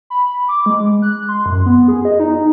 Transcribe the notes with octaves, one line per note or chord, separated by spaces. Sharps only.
B5
D6
G#3
F#6
C6
F#2
B3
G#4
D#5
D#4